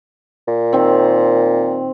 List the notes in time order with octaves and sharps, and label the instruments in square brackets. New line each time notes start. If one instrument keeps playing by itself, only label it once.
[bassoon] A#2
[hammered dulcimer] D#3 C4